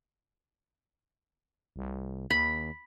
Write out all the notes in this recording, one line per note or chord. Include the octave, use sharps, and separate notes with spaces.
C2
D#2 B5